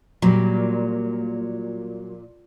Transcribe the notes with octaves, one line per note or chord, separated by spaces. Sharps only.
A#2 F#3 G3